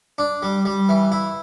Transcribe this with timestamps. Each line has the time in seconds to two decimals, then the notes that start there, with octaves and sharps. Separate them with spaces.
0.18 D4
0.43 G3
0.65 G3
0.89 E3
1.12 E4